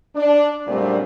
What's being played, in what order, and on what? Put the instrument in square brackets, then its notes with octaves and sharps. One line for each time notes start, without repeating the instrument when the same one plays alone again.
[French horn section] D4
F#2 A#2 G3 A3 C4 D4